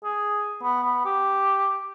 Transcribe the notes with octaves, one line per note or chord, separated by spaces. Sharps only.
G#4
B3
B3
G4